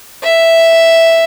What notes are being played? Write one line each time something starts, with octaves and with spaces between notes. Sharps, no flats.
E5